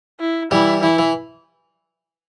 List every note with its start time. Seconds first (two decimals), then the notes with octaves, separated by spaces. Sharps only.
0.20 E4
0.51 E3 G3 E4
0.82 E3 E4
0.99 E3